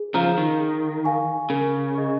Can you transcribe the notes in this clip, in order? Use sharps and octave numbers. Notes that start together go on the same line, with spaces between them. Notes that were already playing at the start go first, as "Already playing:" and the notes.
Already playing: G#4
C#3 F3 F5 A#5
D#3
G#4
F5 G#5 C#6
C#3 A#4
D#5 C#6